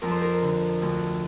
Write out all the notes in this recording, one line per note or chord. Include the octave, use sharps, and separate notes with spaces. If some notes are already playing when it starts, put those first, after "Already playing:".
F2 A#4
C5
A#4
D3
D2